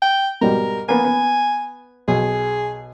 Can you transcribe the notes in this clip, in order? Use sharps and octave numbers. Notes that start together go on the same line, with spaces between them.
G5
G#2 B2 G3 A#4
A#3 B3 G#5
B3
B1 G#4